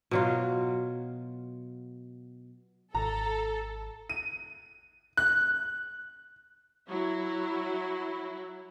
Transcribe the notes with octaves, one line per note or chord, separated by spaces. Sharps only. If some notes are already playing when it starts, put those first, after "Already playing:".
B2 F#3 F4
G#1 A4 A#5
D#7
F#6
F#3 E4